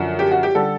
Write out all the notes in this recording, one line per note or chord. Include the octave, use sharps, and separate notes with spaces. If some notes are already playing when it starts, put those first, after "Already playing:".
Already playing: F#2 D3 F3
G4
F#4
G4
D3 G3 A4